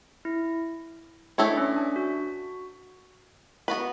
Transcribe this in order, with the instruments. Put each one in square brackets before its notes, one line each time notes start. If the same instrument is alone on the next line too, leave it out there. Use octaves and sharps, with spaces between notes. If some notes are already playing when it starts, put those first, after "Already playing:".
[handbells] E4
[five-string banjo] E3 A3 E4 A4 C#5 [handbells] D4
[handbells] C#4
D4
F#4
[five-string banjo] B3 F#4 B4